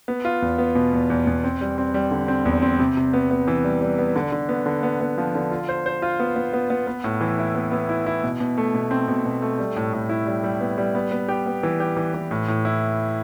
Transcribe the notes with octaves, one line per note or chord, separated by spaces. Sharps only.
B3
F4
E2
B3
B2
E2
E2
E2
C4
G3
C4
G3
D3
C4
E2
C4
C3
C3
B3
B3
E3
G3
G3
B3
D3
D3
B3
D3
B3
B3
F3
D3
F4
C5
C5
F4
B3
B3
B3
B3
B3
A2
E3
E4
B3
B3
E4
E4
B2
B2
A3
B2
C4
B2
B2
A3
G3
A2
A2
E4
G3
G3
B3
G3
B3
B3
G4
B3
E3
G4
E3
E3
A2
A2
E4